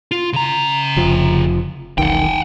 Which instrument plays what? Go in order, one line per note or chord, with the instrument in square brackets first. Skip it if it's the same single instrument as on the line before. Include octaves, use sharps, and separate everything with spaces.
[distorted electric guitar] F4
C#3 A#5
[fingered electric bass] F1 F3
[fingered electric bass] E1 B1 D#3 [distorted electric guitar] F#5 G5